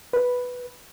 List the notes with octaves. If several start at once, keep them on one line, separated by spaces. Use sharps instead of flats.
B4